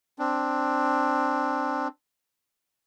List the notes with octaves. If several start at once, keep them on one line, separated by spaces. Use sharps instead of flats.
C4 D4